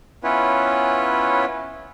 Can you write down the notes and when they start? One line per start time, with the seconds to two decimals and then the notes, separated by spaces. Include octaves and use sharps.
0.24 B3 C#4 E4 F4 B4 C#5